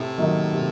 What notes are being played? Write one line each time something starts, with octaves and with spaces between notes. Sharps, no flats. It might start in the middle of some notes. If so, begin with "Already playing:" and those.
Already playing: A2 C3
D#3 F#3 A#3 D#4
C3